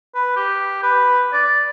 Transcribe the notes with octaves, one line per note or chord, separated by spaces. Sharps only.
B4
G4
B4
D5